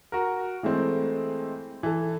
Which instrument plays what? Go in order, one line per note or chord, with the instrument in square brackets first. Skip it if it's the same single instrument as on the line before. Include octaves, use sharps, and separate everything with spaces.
[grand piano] F#4 A#4
E3 G#3 A3 C4
E3 A4